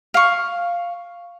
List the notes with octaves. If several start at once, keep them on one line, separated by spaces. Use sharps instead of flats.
F5 C#6